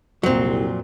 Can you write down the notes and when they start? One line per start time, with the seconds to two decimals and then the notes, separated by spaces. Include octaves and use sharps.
0.23 C2 F2 A#2 F#3 C4